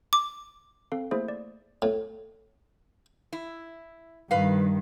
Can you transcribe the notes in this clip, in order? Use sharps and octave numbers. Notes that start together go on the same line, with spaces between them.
D6
C4 A4 F5
A3 A#3 E4 G#4 C5 E5
D5
A2
E4
G2 D#3 B4 F5